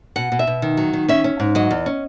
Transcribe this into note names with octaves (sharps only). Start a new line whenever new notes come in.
B2 F#5
B2
E5
B2
D#3
F#3
D#3
C#4 E5
C#4
G#2
F#3 D#5
E2
C#4